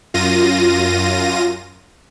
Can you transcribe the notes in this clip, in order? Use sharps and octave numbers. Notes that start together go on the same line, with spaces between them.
F#2 F4 A#6 D#7